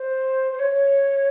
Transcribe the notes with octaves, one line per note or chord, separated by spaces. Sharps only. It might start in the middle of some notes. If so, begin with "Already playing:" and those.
Already playing: C5
C5
C#5